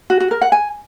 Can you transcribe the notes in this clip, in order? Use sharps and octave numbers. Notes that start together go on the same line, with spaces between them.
F#4
F#4
A#4
F#5
G#5